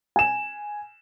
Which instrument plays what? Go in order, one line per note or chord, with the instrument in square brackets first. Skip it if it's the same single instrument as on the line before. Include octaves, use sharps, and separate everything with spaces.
[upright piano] G#5 E7